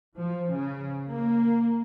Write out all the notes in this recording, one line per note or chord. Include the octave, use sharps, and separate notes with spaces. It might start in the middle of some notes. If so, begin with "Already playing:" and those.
F3
C#3
A#3